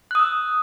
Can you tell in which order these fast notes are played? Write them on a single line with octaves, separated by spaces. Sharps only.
F#6 D#6 E6